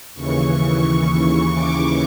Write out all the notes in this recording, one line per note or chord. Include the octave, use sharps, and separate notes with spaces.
D#2 C#3 E3 C#6
D6